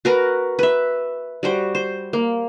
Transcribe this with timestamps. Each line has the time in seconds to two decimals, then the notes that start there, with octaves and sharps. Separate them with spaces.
0.05 F#4 A#4 B4
0.59 B4 E5
1.43 G3 F#4 C5
1.75 C5
2.13 A#3